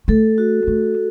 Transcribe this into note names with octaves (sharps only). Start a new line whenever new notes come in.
A3 A4
F#4
A3